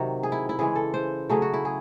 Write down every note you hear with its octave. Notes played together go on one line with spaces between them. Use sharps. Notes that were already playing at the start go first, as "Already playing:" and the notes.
Already playing: C3 D#3 F#3
G#4
E4
E4
C#3 E3 G#3 G#4
A4
C5
C#3 F#3 A3 G#4
F#4
E4
G#4